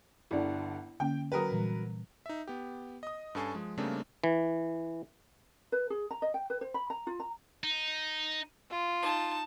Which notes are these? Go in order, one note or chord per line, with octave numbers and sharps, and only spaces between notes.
G1 D3 E4 D5
D3 A#3 C#4 G5
F#3 A#4 B4 G5 D#6
A#2 E3 G3
D#4 E5
B3 G4
D#5 D#6
G2 C#4 A4 G#5 C#6 C7
F3 G#3
C#3 G3 A3 A#3 C4 D4
E3
B4
G#4
A#5
D#5
G5
B4
C5
B5
A#5
F4
A#5
D#4
F4
D#4 A5